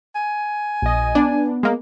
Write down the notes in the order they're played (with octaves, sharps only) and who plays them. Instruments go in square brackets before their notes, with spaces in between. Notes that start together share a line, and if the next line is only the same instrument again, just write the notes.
[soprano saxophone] G#5
[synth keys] A#1 D#5
[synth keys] B3 [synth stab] D4
[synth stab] G#3 A#3